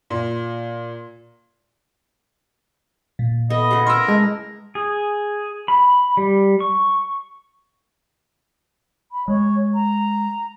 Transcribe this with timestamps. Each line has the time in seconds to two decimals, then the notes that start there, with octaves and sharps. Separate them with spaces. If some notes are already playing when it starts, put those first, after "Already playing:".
0.10 A#2
3.19 A#2
3.50 B3 E4 A4 D#5
3.71 C#3 G#4 F#5
3.87 E4 A#4 D#5 C6 E6
4.08 G#3 A5
4.75 G#4
5.68 B5
6.17 G3
6.60 C#6
9.12 B5
9.28 G#3 C#5
9.74 A#5